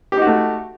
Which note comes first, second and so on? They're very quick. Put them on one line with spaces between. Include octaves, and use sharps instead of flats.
G4 D#4 F#4 A3